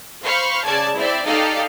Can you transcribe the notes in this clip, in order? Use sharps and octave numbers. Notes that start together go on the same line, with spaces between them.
C5 F5 B5 C#6
C#3 D5 A5 G#6
C4 E4 D5 E5
D#4 G4 A4 D5 D#5 F5